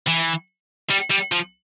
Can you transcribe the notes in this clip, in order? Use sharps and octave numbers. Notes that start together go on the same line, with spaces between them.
E3
G3
G3
F3